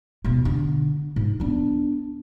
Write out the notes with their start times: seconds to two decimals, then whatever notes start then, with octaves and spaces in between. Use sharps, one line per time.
0.24 D#2 B2
0.45 D3
1.16 G#2
1.40 B3 D4